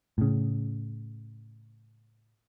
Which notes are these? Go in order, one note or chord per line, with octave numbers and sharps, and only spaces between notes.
A2 C#3